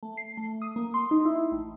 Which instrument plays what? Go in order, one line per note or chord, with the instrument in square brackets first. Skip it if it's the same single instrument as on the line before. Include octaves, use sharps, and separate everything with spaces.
[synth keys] A3
C7
A3
D#6
A#3
C6
D#4
E4
A1